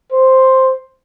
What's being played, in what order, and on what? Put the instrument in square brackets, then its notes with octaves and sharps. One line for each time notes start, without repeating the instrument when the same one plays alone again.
[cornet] C5